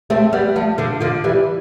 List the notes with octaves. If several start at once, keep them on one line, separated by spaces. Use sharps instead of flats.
A3 C4
G3 B3
F3 A3
D3 F3
D3 F3
E3 G3